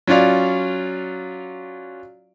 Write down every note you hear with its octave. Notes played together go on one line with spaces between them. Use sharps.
F#3 C#4 F4 D5 F5